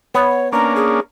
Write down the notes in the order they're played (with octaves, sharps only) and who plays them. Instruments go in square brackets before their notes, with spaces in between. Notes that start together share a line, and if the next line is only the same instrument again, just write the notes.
[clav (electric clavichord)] B3 [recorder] C#5
[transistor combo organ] A#3 C#4 D4 [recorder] A#5
[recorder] G#4